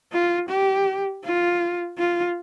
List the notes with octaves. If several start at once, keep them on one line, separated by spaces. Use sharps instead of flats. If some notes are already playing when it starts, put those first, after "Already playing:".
F4
G4
F4
F4